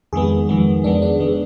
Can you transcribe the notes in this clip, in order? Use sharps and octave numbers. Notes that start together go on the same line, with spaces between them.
F2 D#3 G#3 B3 G#4
F2 D#3 G#3 B3
F2 D#3 G#3 B3 D4
D4
F2 D#3 G#3 B3